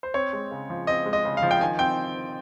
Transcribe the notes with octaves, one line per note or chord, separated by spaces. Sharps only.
C5
C4 C#5
G#3
C#3
F3
C4 D#5
G#3
D#5
C#3
F5
F3
G5
D#3 G#5
C4 G5